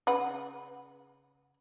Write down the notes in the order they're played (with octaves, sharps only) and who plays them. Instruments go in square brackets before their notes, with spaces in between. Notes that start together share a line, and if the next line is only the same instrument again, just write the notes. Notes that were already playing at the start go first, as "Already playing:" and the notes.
[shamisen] C#3 B4 F#5